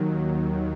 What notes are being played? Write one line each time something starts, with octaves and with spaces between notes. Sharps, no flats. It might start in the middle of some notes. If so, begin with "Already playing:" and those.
Already playing: D#2 D#3 F#3